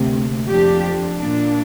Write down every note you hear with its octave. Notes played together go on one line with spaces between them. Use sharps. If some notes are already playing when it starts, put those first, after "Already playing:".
Already playing: D2 C3 A#3
F2 F3 D4 G4
A#2 A#3 D4